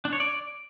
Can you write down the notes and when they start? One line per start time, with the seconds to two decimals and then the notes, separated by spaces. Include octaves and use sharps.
0.05 D4
0.13 C#5
0.20 D5